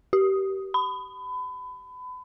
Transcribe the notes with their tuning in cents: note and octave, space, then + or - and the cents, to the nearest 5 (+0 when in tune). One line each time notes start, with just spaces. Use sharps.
G4 -25
B5 +30